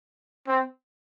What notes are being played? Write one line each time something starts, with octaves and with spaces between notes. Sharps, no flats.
C4